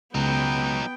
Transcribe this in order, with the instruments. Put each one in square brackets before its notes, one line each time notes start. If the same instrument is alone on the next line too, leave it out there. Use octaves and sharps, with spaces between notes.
[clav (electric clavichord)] C#2 [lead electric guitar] F#3 D#4 [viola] B3 G5